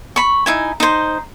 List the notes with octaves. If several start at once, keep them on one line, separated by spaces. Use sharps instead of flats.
B5 C#6
D#4 E4 G#5
D#4 C5